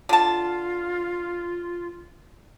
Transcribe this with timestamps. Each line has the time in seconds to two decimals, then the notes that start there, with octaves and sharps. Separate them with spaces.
0.09 D3 F4 A5